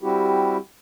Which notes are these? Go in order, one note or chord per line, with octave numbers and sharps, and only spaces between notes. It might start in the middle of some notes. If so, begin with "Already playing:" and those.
G3 C4 E4 F#4 G4